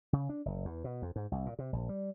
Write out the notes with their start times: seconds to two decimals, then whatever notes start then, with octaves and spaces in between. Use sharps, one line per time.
0.13 C#3
0.29 D4
0.45 F#1
0.65 E2
0.84 B2
1.02 F2
1.16 G#2
1.32 C2
1.46 A#2
1.59 C3
1.73 A#1
1.89 G3